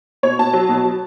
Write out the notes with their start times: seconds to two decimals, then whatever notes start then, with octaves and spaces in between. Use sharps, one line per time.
0.23 B2 C#5
0.39 B2 A5
0.53 F#3
0.69 B2
0.84 F#3